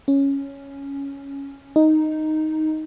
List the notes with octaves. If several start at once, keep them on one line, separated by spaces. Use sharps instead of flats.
C#4
D#4